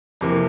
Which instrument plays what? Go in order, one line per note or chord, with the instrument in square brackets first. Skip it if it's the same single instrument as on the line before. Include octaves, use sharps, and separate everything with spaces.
[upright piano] F2 C3 E3 A#3